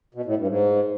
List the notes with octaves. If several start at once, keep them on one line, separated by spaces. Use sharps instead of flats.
B2
A2
G2
G#2